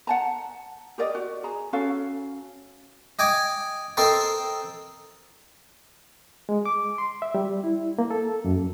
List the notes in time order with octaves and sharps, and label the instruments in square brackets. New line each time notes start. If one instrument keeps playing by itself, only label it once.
[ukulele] F#5 A5 A#5
G4 A#4 D5 D#5
F#4
G#4 A#5
C#4 F#4 A4 F5
[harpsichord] D#5 G5 G#5 D6
C4 A4 A#4 C5 D#5 G5
[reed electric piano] G#3
D6
C6
E5
G3
E4
A#3
A4
F#2